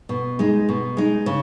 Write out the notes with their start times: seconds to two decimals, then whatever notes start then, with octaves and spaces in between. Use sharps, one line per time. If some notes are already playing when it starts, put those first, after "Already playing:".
0.09 B2
0.39 G#3 D#4
0.69 B2
0.97 G#3 D#4
1.26 C#3